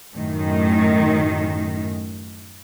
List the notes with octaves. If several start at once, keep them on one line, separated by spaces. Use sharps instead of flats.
F#2 A2 D#3